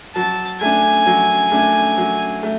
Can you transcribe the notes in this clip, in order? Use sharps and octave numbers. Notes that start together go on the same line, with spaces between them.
F#3 A5
A3 D4 G#5
F#3
A3 D4
F#3
A3